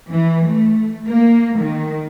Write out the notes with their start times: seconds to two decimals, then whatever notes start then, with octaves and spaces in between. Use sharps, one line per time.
0.10 E3
0.46 A3
1.07 A#3
1.58 D#3